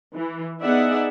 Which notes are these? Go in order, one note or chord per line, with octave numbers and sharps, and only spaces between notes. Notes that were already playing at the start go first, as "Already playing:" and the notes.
E3
B3 D#4 G#4 D5 E5 F#5